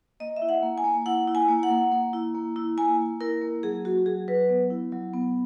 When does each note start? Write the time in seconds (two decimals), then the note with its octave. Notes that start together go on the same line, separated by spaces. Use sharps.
0.20 A#3 D#5
0.36 E5
0.42 E4
0.49 F#5
0.63 A#3
0.78 G#5
0.84 A#3
1.06 E4 F#5
1.28 E4
1.35 G#5
1.49 A#3
1.63 F#5
1.70 A#3
1.92 A#3
2.13 E4
2.35 A#3
2.56 E4
2.77 A#3 G#5
2.99 A#3
3.20 E4 A#4
3.42 A#3
3.63 F#3 G#4
3.85 F#3 F#4
4.06 F#3 G#4
4.28 F#3 B4
4.49 B3
4.70 E4
4.92 F#3
5.14 B3